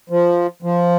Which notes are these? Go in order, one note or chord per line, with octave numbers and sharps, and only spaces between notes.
F3
F3